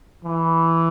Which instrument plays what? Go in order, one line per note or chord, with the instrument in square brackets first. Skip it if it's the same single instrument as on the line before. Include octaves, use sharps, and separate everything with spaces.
[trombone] E3